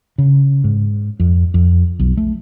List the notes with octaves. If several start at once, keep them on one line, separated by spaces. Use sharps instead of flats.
C#3
G#2
F2
F2
B1
A3